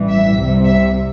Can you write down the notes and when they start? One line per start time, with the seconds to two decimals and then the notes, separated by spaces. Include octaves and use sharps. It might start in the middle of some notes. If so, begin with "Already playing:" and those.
Already playing: A1 G2 E3 G3
0.09 E5
0.37 C2 C3 G3
0.65 E5